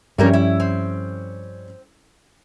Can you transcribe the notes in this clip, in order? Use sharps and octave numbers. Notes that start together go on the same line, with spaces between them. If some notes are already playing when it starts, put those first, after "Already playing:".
G2 F3 G3 A3 A#3 C#4 A#4
E4
C4